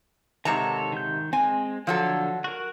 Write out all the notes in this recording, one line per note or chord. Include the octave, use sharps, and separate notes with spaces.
G#2 C3 D#3 A4 C#5 A#5
D#3 G6
G#3 C4 G#5
D3 F3 F#3 A4 E6
F#4 A#4